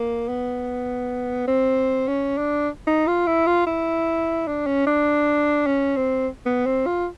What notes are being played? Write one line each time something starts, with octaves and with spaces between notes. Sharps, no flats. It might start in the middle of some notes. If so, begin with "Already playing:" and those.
Already playing: A#3
B3
C4
C#4
D4
D#4
F4
E4
F4
E4
D4
C#4
D4
C#4
C4
B3
C4
F4